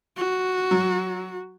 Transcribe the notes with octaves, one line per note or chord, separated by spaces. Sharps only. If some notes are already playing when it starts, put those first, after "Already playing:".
F#4
F#3